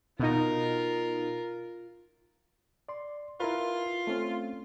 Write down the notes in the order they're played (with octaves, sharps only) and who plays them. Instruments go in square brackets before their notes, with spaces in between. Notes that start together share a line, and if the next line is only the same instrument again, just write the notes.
[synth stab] B2 D#4 [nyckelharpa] F4 A#4
[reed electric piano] D5 C6
[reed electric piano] E4 A#4 B4 [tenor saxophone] F4
[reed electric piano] A3 C4 C#4